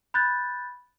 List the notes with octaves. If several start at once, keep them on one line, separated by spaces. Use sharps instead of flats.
B5 F#6 G6 A6